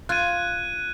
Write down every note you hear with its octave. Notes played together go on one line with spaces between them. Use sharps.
F4 F#6 G#6 D#7